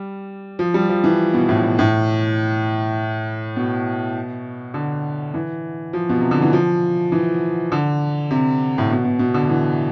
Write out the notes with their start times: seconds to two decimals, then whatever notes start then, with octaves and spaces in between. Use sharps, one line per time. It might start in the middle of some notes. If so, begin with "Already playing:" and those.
Already playing: G3
0.59 F3
0.74 G3
0.89 F3
1.04 E3
1.34 B2
1.49 A2
1.63 B2
1.79 A2
3.56 B2
4.74 D3
5.34 E3
5.93 F3
6.09 B2
6.20 C3
6.31 D3
6.42 E3
6.53 F3
7.12 E3
7.72 D3
8.31 C3
8.78 A2
8.90 B2
9.04 B2
9.19 B2
9.34 D3
9.49 E3